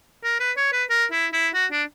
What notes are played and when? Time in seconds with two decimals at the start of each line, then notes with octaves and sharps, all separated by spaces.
0.24 A#4
0.40 B4
0.57 C#5
0.73 B4
0.90 A#4
1.12 E4
1.33 E4
1.54 F#4
1.72 D4